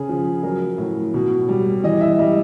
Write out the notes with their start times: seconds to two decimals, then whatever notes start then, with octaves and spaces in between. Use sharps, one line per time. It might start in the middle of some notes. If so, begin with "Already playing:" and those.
Already playing: C#3 G#4
0.09 F3
0.43 F#3 A#4
0.78 A2
1.14 B2
1.49 G3
1.84 E3 D#5
2.01 E5
2.19 G3 D#5